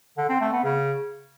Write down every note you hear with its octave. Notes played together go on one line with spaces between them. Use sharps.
D3
C4
A3
B3
C#3